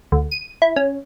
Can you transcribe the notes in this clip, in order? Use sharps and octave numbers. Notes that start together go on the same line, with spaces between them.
D2
D#7
E4
C#4